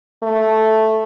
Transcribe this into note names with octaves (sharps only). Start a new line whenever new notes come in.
A3